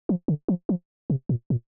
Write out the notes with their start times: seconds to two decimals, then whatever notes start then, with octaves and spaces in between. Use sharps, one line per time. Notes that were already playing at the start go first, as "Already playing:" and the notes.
0.09 F3
0.28 D3
0.48 F3
0.69 F3
1.10 C3
1.29 A#2
1.50 A#2